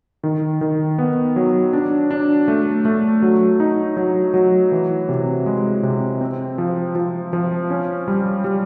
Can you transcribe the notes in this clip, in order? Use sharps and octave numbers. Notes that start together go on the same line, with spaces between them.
D#3
D#3
B3
F#3
D4
D4
A3
A3
F#3
D#4
F#3
F#3
E3
C3
G#3
C3
C4
F3
F3
F3
C#4
G3
G3